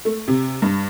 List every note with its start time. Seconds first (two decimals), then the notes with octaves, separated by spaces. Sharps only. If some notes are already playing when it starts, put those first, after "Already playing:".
0.05 A3
0.28 C3
0.62 G2